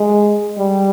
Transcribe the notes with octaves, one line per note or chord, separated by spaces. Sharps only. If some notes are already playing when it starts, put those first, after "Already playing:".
Already playing: G#3
G3